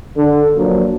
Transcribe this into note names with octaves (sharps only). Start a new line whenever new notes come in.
D3
F3 F#3 A#3 D4